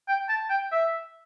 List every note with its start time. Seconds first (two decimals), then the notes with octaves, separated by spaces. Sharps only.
0.08 G5
0.29 A5
0.50 G5
0.72 E5